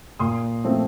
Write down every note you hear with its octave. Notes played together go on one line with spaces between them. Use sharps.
A#2 C6 D#6
F3 A3 C4